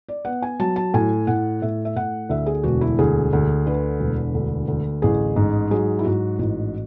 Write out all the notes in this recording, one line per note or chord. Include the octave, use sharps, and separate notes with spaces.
D5
B3 F#5
G#5
F#3 A5
A5
A2 G#5
A2 F#5
A2 E5
E5
A2 F#5
D2 E5
G#4
E1 F#4
E4
D2 G#4
D2
D3 B4
E1
D2
D2
A1 G#4
G#2
F#3 G#4
E4
G#2 F#4
A1 F#4